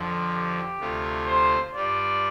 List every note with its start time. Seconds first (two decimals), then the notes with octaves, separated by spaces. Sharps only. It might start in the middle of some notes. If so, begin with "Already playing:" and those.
Already playing: F2 D3 F3
0.31 G4
0.78 D2 C3 A3 F4
1.27 C5
1.75 G2 G3 F4 D5